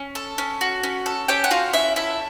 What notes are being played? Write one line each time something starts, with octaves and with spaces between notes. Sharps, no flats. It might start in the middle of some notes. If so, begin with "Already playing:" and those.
Already playing: C#4
A4
C#4
F#4
C#4
A4
C#4 G4 G5
F#5
F4 F#4 F5
C#4 E4 E5
E4 A4 E5